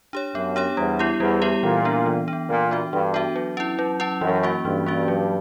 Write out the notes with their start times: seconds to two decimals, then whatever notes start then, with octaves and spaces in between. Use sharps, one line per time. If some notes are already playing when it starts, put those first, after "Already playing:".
0.13 D4 G4 C#5
0.35 F#2 B3
0.56 D4 G4 C#5
0.77 E2 G3
0.99 B3 E4 G4
1.20 E2 G3
1.42 B3 E4 G4
1.63 A#2 E3
1.85 B3 D4
2.06 E3
2.28 D4
2.33 B3
2.49 A#2 E3
2.71 B3 D4 F#4
2.93 G2 E3
3.14 B3 D4 F#4
3.36 F#3
3.57 C#4 E4
3.79 F#3
4.00 C#4 E4
4.21 F#2 E3
4.43 A#3 C#4 F#4
4.65 G2 E3
4.86 A#3 C#4 F#4
5.08 F#3